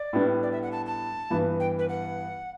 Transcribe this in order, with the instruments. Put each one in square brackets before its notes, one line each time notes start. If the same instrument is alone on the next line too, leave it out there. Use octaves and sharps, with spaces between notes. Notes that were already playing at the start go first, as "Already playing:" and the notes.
Already playing: [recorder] D5
[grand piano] A2 G3 B3 D4
[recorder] D5
E5
F#5
A5
A5
[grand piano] G2 E3 B3
[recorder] G5
B4
F#5